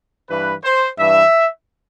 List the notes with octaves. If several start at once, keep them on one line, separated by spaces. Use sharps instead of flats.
G2 E3 B4
C5
G2 E3 E5